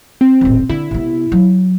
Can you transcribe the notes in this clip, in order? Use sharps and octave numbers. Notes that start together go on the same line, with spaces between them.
C4
D#1 A1
D3 E4
C3 B3
F#3